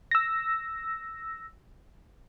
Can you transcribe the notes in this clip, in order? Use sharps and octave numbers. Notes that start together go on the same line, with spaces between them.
E6 A#6